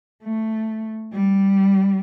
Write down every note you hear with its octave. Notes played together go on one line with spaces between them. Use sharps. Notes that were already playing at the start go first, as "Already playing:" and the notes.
A3
G3